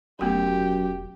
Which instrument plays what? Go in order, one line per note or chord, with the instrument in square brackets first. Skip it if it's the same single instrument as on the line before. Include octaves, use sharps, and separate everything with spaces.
[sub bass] E1 [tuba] F#2 [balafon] A3 B3 F#4 [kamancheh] G4